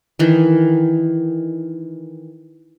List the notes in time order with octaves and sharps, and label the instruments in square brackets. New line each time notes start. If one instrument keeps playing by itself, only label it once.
[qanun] D#3 E3